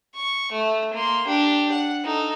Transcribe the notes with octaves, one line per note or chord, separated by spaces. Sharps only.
C#6
A3
A#3 C6
D4 G4
F#5
D#4 A4